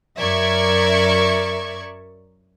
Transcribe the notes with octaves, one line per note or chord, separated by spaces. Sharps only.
F#2 A#4 D5 E5 C#6 G#6